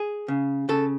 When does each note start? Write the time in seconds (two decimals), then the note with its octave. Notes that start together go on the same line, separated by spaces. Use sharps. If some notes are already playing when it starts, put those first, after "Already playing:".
Already playing: G#4
0.28 C#3
0.69 C#3 A4